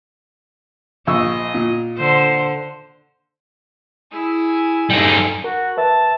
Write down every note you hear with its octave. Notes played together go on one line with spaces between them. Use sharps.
A#1 D#5 C#6 E6
A#2
D3 C5
E4 G#4
G2 D3 G3 D#4 G#4
F#4 A#4
B4 E5 A5